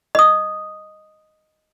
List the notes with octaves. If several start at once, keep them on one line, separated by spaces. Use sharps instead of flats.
D#5 D#6